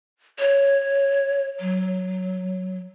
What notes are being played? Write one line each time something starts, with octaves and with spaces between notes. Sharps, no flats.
C#5
F#3